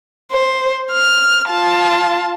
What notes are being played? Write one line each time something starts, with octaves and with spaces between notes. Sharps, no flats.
C5
F6
F4 A5